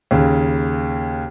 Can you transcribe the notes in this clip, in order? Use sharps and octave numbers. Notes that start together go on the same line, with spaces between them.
D#2 C#3